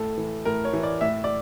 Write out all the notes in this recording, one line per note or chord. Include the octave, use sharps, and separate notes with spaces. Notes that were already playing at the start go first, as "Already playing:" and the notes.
Already playing: A2 A4
E3
A2 A#4
C#5
E3
D5
A2 E5
D5